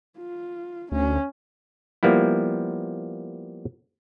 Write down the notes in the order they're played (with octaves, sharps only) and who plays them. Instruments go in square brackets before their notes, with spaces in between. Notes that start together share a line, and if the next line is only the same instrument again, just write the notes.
[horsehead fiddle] F4
[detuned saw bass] D2 [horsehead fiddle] C#4
[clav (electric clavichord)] F3 G3 A#3 B3 E4